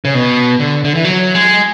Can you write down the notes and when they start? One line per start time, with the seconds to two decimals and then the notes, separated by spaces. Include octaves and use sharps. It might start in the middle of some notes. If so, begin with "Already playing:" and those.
0.05 C#3
0.14 B2
0.60 D3
0.84 D3
0.95 E3
1.04 F#3
1.35 G#3